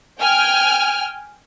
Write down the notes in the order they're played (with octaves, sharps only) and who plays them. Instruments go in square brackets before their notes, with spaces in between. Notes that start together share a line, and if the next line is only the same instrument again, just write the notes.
[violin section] G5 G#5 F6